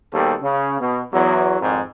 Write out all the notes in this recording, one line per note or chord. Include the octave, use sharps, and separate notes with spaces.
D#2 B2 G3 A4
C#3
B2
E2 F#3
G#1 F2 G#2